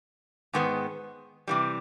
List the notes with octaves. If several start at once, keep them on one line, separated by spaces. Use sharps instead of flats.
G#2 D#3 G#3 B3
C3 E3 G3